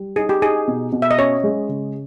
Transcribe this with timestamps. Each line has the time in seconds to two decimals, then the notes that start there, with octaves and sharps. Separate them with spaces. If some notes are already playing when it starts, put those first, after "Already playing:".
Already playing: G3
0.16 D#4 G#4
0.29 G4
0.42 D#4 G#4
0.68 B2
0.92 B2
1.02 E5
1.11 D#5
1.19 C#4 C#5
1.44 G#3
1.69 C#3